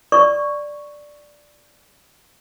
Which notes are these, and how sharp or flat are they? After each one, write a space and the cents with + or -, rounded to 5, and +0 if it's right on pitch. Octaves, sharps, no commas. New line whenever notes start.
D5 +0 C#6 +0